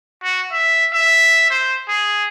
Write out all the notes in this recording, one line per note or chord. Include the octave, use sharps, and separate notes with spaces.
F#4
E5
E5
C5
G#4